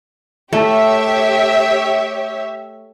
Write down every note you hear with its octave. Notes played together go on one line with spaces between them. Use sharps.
A3 G4 C#5 E5